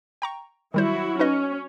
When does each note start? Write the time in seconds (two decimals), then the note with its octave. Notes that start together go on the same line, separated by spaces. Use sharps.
0.22 G5 A#5 C#6
0.74 D#3 F#3 G3 E4 F#4 C5
1.19 C#4 D#4 B4 D#5